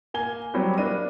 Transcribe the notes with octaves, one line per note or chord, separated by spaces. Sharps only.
A#3 G#5 G7
F#3 G3 B3 C4 G4
A#3 D4 D#7